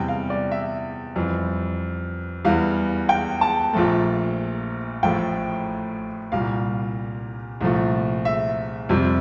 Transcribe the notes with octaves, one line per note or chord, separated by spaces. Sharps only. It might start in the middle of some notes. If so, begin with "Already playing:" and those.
Already playing: E2 C3 G3 G5
F5
D5
E5
F2 E3 G3
E2 E3 G3 F5
G5
A5
A#1 A#2 F3 A3
A1 A2 F3 A3 G5
C2 A#2 G3 F5
C2 A#2 F3 A3
E5
F2 C3 G3